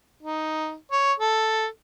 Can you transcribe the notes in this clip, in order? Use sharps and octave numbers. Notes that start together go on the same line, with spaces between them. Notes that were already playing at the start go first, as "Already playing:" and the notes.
D#4
C#5
A4